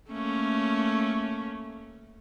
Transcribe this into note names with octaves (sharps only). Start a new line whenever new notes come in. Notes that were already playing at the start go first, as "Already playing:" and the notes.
A3 A#3 C#4